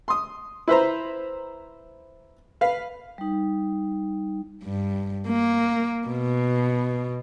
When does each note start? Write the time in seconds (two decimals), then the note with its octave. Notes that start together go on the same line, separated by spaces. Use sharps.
0.08 C6 D#6
0.68 E4 B4 C5 A#5
2.61 B4 F5
3.18 G3 D#4
4.64 G2
5.28 A#3
6.07 B2